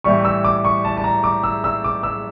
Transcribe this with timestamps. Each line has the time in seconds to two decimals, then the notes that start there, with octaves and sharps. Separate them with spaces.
0.04 A2 E3 G3 C#6
0.25 E6
0.45 D6
0.65 C#6
0.85 A5
0.97 A5
1.04 A#5
1.24 D6
1.44 E6
1.64 E6
1.84 D6
2.03 E6